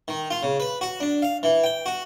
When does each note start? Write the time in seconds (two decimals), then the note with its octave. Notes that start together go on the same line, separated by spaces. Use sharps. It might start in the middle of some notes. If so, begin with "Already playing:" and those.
0.08 D#3
0.30 F4
0.43 C#3
0.60 B4
0.81 F#4
1.00 D4
1.22 F5
1.43 E3
1.64 G5
1.86 F#4